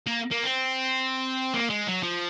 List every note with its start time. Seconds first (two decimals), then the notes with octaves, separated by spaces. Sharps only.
0.06 A#3
0.31 A#3
0.43 C4
1.54 A#3
1.70 G#3
1.87 F#3
2.03 F3